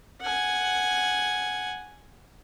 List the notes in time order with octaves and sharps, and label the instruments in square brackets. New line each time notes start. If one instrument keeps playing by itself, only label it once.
[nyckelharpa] F#5 G#5